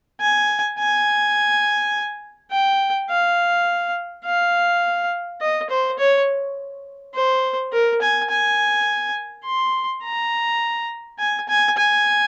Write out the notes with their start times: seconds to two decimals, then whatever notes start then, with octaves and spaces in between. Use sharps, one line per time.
0.21 G#5
0.79 G#5
2.51 G5
3.10 F5
4.25 F5
5.41 D#5
5.70 C5
5.99 C#5
7.15 C5
7.73 A#4
8.02 G#5
8.30 G#5
9.45 C6
10.04 A#5
11.19 G#5
11.49 G#5
11.77 G#5